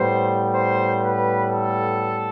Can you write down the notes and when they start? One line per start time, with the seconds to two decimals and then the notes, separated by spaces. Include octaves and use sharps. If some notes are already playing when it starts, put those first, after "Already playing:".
Already playing: A2 G3 B3 C5
0.53 C5
1.00 B4
1.49 A4